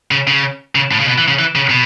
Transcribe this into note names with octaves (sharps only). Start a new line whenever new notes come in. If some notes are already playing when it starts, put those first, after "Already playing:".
C#3
C#3
C#3
A2
C#3
B2
E3
C#3
E3
C#3
B2